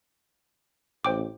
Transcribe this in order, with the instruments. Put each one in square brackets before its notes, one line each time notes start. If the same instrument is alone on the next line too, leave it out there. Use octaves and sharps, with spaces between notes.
[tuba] A1 [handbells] C5 G5 D6